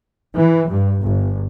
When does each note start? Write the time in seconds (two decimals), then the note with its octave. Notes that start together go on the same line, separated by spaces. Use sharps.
0.35 E3
0.70 G2
1.02 G1